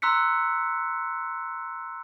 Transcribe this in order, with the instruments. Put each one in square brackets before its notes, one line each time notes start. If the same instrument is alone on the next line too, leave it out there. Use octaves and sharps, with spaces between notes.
[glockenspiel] A#5 C6 E6 F#6 B6 C#7